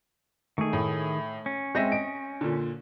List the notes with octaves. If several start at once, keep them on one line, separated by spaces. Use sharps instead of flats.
D#3 A3 D#4 G#4 C#6
A2
C#4
G#3 C4 E5 G6 A#6 D#7
D#5 D7
A#2 D3